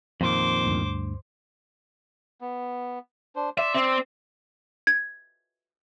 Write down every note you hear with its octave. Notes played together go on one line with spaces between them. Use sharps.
F2 A#2 D#3 C5 D6
D2 G2
B3
D4 C5
D5 E5 C6 E6
C4
G#6